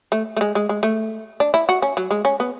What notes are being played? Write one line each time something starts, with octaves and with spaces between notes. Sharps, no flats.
A3
A3
G#3
G#3
G#3
A3
D4
E4
F#4
C#4
F#3
G#3
C#4
B3